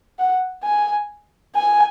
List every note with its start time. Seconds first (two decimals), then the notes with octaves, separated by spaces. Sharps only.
0.19 F#5
0.64 G#5
1.55 G#5